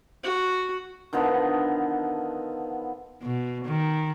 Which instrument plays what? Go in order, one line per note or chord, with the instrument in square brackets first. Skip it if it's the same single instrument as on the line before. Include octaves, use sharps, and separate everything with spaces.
[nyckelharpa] F#4
[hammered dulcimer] D3 D#3 F3 B3
[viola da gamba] B2
D#3